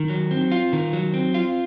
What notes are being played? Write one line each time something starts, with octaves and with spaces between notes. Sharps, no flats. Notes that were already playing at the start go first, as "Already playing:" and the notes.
Already playing: D#3
F#3
C4
F4
D#3
F#3
C4
F4